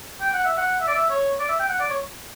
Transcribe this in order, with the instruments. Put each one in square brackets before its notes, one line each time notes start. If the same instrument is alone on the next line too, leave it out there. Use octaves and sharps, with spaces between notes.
[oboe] G5
F#5
E5
F#5
E5
D5
E5
C#5
D5
E5
G5
F#5
D5
C#5